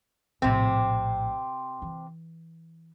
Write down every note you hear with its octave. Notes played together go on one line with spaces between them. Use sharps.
A#1 A2 C3 C4
E3